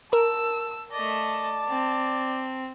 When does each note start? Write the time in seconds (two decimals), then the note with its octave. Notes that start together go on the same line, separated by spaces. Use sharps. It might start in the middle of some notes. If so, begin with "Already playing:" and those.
0.13 A#4 A5 E6
0.92 A3 D5 D#5 A5
1.69 C4